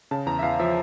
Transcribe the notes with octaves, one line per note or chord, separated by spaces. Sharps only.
C#3 A5
E2 A#5
E5
E2 F5
F3 E5